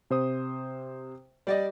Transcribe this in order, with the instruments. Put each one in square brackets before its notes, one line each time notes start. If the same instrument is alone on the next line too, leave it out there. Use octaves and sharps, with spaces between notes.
[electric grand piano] C3 C5 D#6
[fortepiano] G3 D5 D#5